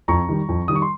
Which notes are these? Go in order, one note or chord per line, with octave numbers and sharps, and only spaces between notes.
F2 A#5 C#6
D#3 G3
F2
D#3 G3 D#6
C#6
C6